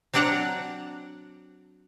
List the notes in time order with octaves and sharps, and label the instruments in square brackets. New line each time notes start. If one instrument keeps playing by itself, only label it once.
[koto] F#3 C4 D4 D5 F#5 A#5